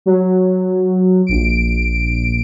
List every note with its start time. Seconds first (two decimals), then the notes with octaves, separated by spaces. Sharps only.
0.06 F#3
1.26 A#1 D7